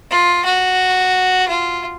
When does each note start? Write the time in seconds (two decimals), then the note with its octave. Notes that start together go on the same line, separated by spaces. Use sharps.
0.11 F4
0.45 F#4
1.48 F4